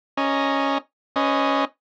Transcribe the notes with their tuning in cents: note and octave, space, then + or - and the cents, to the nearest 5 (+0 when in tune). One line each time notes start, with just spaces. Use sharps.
C#4 +0 D#5 +0 A#5 +0
C#4 +0 B4 +30 D#5 +0